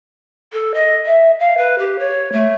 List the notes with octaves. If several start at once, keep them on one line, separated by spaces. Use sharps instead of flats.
A4
D#5
E5
F5
B4
G4
C#5
A3